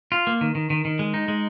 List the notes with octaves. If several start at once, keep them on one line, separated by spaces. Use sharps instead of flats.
F4
A#3
D#3
D#3
D#3
D#3
G#3
D#4
G#3